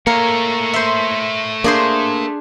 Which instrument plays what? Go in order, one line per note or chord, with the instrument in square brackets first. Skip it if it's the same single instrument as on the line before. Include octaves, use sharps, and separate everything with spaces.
[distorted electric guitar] A3 C#5 [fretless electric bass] A#3 [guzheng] A#4
[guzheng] C5 E5
[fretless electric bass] A#3 [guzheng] D4 G#4 C5